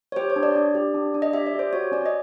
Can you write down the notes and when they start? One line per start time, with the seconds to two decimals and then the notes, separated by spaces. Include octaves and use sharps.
0.12 C#5
0.16 G4 C5
0.30 C#5
0.36 D4
0.43 D5
0.56 D4
0.75 G4
0.94 D4
1.14 D4
1.22 D#5
1.33 G4 E5
1.47 D5
1.54 G4
1.59 C5
1.73 F#4 C#5
1.92 C#4 D5
2.06 D#5